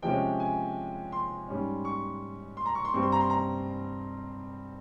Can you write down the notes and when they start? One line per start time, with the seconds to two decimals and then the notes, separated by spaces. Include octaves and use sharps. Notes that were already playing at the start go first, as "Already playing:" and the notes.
0.02 C3 F3 G#3 C#4 G5
0.40 G#5
1.12 C6
1.48 G#2 G3 C#4
1.85 C#6
2.57 C6
2.66 A#5
2.75 C#6
2.85 C6
2.94 G2 G3 C4 C#6
3.02 C6
3.12 A#5
3.20 C6
3.30 A#5